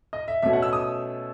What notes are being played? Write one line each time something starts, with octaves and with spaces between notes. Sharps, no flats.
D#5
E5
B2 A3 C#4 E5
F#5
E6
D#6